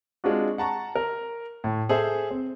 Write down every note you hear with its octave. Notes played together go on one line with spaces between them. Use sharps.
G#3 C4 D4 F4 F#4
F#5 A5 A#5 C#6
A#4
A2
G#4 A4 C5 E5 G#5
C4